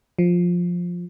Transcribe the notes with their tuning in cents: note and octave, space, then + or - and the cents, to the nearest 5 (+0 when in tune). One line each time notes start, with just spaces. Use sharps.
F3 +10